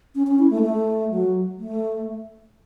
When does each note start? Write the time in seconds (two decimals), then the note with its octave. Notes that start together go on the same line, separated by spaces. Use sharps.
0.15 C#4
0.27 C#4
0.39 E4
0.50 A3
0.62 A3
1.10 F#3
1.59 A3